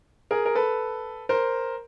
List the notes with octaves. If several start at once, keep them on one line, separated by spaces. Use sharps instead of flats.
G#4 A#4
A#4
A4 B4
A#4 C5